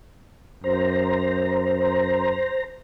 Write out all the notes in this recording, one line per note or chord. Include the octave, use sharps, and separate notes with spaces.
F#2 C5 A#5